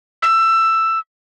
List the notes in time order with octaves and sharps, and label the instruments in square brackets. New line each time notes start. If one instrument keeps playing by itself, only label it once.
[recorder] E6